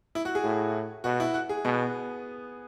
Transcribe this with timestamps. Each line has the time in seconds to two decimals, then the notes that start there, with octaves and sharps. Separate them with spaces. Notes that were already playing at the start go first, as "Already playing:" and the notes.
0.15 E4
0.25 F#4
0.35 G#4
0.44 A2
1.04 B2 F#4
1.20 E4
1.34 F#4
1.49 G#4
1.65 B2 B3